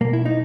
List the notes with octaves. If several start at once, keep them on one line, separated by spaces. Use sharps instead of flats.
B1 B2 A#3
E4
D#4